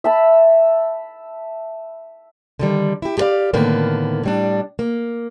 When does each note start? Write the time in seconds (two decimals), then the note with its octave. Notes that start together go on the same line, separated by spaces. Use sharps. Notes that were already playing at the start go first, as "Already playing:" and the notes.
0.04 E5 A5 B5
2.59 D3 D#3 G3
3.02 E4 G4
3.18 G4 G#4 B4 D5 F5
3.53 A2 D3 D#3 A#3 B3
4.23 A2 G3 D4
4.79 A#3